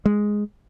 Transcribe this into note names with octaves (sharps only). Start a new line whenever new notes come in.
G#3